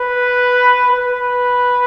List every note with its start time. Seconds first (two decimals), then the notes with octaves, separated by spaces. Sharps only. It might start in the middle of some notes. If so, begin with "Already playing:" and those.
Already playing: B4
0.91 B4